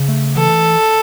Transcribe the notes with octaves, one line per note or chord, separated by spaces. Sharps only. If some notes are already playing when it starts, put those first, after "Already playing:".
Already playing: C#3
A3
E3 A4